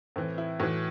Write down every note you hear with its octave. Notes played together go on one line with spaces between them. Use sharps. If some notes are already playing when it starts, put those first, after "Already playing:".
A2 E3 C4
E4
A2 E3 F#4